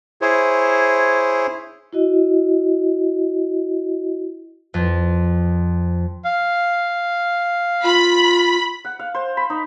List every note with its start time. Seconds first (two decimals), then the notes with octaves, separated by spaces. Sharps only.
0.21 E4 G#4 C5 C#5
1.93 E4 F#4 D#5
4.74 F2
6.25 F5
7.84 F4 B5
8.85 F#5
8.99 F5
9.15 C5
9.37 B5
9.50 D#4